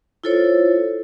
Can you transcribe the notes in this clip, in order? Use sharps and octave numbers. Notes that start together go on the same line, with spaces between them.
E4 F4 A4 C5 C#5